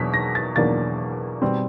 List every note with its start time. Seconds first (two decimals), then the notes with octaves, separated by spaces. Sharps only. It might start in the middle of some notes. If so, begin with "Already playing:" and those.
Already playing: E2 B2 F#3 A#3 D4 B6
0.14 A#6
0.35 A6
0.56 E2 B2 F#3 A#3 D4 A6
1.42 B2 G3 C4